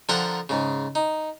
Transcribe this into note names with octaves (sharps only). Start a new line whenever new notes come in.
D3 F3 A#4 F#5 G5 A#5
G#2 C#3
D#4